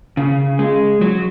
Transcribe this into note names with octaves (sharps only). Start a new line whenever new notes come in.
C#3
G#3
F#3